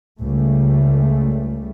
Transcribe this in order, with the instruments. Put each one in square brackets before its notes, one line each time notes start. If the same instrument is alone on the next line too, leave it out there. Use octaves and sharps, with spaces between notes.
[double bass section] C#2 C#3 G3 A3